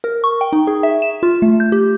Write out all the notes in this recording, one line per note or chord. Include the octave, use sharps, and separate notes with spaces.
A#4
C#6
G5
D#4
G#4
E5
E7
F4
A3
G6
G4